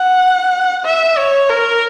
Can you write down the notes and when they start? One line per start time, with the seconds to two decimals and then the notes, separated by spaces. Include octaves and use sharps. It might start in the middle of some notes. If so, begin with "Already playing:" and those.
Already playing: F#5
0.85 E5
1.17 C#5
1.49 A#4